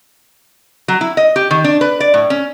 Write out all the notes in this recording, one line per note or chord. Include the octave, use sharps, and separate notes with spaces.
F#3
E4
D#5
G4
D#3
D4
B4
D5
A2
C#4